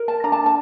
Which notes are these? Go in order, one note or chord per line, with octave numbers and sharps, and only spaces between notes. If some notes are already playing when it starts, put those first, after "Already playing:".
Already playing: A#4
A5
D4 A#5
A5
A5